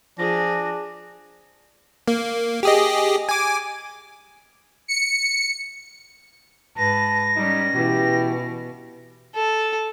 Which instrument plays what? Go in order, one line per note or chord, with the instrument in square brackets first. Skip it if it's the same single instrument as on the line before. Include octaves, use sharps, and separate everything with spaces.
[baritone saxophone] F3 [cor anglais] D4 [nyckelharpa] G#4 [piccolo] A#6
[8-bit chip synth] A#3
G4 G#4 D#5
G#5 D6
[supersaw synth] C#7
[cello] G#2 B4 [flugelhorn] A5 [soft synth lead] A#6
[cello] G3 C#4 [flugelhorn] D#4
[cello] B2 [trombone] E3 [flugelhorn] G4
[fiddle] A4